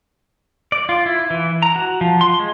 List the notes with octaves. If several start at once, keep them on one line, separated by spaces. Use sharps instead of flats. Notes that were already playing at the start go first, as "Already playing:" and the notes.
D5
F4
E4
E3
A#5
F#4
F3
C6
G#3